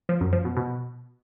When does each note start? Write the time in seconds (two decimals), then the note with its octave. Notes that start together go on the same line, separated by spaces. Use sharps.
0.09 F3
0.21 F#2
0.33 F3
0.45 B2
0.57 B2